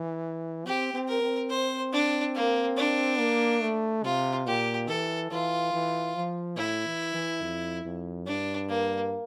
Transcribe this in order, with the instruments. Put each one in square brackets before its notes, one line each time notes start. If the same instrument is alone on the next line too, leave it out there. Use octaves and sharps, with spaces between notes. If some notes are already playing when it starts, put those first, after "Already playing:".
Already playing: [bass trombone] E3
[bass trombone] C4 [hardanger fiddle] G4
[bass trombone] C4
[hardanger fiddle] A#4
[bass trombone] C4
[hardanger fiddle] C5
D4
A#3
D4
[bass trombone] A#3
A3
[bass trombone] C3 [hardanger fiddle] F4
[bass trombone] A#2 [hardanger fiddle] G4
[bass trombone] E3 [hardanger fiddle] A4
[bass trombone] E3 [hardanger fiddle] F4
[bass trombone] E3
F3
[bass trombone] A2 [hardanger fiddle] E4
[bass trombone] E3
E3
F2
F2
[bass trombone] G2 [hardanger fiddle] D4
[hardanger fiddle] A#3